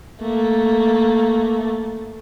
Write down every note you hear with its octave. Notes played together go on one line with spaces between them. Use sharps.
A3 A#3